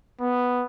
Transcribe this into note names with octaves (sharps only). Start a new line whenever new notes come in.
B3